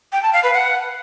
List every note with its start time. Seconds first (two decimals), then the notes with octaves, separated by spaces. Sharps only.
0.12 G5
0.23 A5
0.33 F5
0.43 B4
0.54 F#5